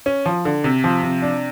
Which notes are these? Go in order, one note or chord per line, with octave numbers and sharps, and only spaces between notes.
C#4
F3
D3
C3
F3
C3
D4